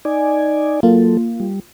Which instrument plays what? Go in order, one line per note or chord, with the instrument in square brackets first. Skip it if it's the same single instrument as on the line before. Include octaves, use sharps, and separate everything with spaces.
[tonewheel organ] D#4 D5 G#5
[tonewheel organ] F#3 A4 [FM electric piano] A#3 F4
[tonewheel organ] G3